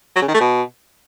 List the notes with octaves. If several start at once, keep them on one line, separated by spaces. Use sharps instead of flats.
F#3
C#3
D#3
A3
B2